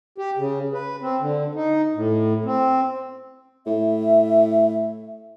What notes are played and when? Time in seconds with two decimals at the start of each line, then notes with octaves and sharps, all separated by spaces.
0.18 G4
0.37 C#3
0.73 B4
1.02 C4
1.20 D3
1.55 D#4
1.95 A2
2.44 C4
3.67 A2 E5